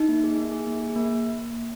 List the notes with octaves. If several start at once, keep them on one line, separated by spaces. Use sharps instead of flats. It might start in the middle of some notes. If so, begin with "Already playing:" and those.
Already playing: D#4
A#3
G#4
A#3
G#4
A#3
G#4
A#3